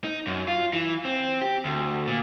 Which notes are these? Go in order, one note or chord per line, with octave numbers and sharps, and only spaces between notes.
D#4
F#2
F4
E3
C4
G4
D2
A#2